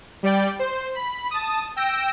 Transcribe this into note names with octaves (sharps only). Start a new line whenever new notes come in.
G3 D5 G5
C5
B5
A5 D#6
G5 E6 A#6 D7 E7